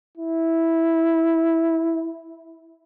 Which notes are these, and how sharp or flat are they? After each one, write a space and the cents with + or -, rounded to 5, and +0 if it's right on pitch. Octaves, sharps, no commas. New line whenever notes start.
E4 -5